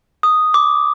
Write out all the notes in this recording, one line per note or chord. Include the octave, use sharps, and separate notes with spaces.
D#6
D6